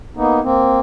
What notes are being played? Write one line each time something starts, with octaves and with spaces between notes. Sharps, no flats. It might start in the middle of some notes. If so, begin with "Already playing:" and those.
A#3 B3 D#4
A#3 C4